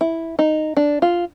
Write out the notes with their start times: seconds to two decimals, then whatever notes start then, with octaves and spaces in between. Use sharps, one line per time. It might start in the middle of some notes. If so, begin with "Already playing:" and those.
0.01 E4
0.39 D#4
0.77 D4
1.02 F4